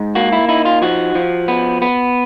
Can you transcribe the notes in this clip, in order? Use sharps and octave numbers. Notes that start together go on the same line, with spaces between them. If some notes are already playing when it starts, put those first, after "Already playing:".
Already playing: G#2
A#3 F#4
E4
D#4 E4
F4
F3 F#4
F3
B3
B3